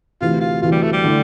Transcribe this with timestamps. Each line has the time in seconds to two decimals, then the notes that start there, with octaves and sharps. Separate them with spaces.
0.21 D2 C3 E3 F4
0.40 F4
0.62 D2 C3 E3 F4
0.72 G3
0.82 A3
0.92 G3
1.03 D3 A3 E4